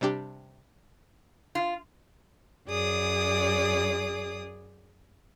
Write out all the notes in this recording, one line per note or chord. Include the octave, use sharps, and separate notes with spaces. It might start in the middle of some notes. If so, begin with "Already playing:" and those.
C3 G3 D4 G4
F4
F#2 G#4 D5 D#6